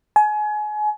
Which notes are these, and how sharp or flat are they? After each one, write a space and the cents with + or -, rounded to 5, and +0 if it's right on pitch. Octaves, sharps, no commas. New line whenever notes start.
G#5 +30